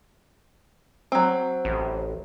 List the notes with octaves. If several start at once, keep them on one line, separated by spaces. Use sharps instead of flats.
F#3 C4
A1